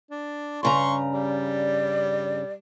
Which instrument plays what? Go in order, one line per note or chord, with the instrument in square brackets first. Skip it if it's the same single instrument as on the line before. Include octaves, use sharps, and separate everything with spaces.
[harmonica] D4
[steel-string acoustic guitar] G2 C#3 A#5 [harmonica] C6 C#6
[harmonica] G3 [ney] D5